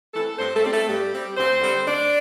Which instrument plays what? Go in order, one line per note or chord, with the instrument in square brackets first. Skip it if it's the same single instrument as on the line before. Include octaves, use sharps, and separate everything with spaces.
[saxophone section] E3 A3 C4 A4
G2 C4 C5
A3 A4
G3 C4
A3 A4
G2 G3 G4
G3 C4
D2 C4 C5
D3 G3 C4
D2 D4 D5